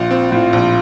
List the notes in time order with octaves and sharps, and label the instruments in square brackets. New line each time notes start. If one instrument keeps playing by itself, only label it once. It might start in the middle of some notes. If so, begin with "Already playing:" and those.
Already playing: [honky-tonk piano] A#1 [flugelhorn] F4
[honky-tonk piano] C4
[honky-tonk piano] A2 [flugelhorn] F4
[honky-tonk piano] A#1